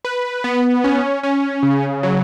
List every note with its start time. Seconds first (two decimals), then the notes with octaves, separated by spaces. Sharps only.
0.05 B4
0.44 B3
0.84 C#4
1.23 C#4
1.63 C#3
2.03 F#3